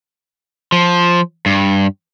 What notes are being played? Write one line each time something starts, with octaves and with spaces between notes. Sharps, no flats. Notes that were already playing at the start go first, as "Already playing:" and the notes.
F3
G2